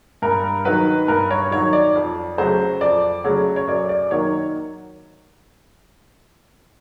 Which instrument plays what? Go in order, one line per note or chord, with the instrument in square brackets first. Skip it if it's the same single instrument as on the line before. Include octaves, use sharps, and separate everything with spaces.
[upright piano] G2 A#4
D#3 F#3 B4
G2 A#4
C#5
D#3 F#3 C#5
D5
F2
C#3 F#3 A3 C5
F2 D5
C#3 F#3 A3 C#5
C#5
F#2 D5
D5
D#3 F#3 A#3 C#5